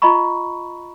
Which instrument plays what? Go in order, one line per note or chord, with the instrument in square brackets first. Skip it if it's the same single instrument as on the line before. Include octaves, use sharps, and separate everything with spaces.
[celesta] F4 D#5 A#5 B5 C#6